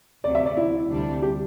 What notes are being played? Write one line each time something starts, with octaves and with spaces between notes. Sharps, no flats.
D2 C3 F#3 D5
E5
D5
E4
D2 C3 G3 D4
G4